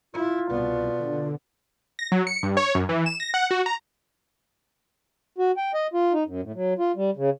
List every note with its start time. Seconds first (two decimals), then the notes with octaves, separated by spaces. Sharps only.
0.14 E4 F4
0.50 C2 B2 B3 D5
0.99 D3
1.99 A#6
2.12 F#3
2.27 C#7
2.43 G2
2.57 C#5
2.75 F#2
2.89 E3
3.06 E7
3.20 A#6
3.34 F#5
3.51 F#4
3.66 A#5
5.38 F#4
5.57 G5
5.74 D#5
5.94 F4
6.13 D#4
6.27 F#2
6.43 A2
6.55 F#3
6.79 F4
6.96 G3
7.17 C#3